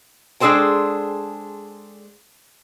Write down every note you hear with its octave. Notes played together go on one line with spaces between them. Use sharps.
G#3 D4 G#4 A4 C5 G5